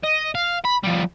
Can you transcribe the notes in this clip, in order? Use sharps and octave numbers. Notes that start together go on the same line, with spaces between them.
D#5
F5
B5
F3 G3